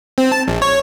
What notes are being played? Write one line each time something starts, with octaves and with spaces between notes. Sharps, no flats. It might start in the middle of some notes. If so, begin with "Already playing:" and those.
C4
A5
A#1
C#5